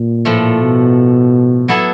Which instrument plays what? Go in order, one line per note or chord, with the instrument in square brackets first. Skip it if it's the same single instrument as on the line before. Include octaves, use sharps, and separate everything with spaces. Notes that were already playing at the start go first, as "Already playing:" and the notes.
Already playing: [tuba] A#2
[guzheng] A2 F3 A3
[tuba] B2
[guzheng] F#3 B3 E4 A4